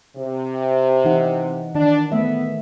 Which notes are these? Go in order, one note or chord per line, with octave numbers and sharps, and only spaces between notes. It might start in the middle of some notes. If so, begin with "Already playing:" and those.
C3
E3 D#4 F#5
D#3 D4
A3 B3 E5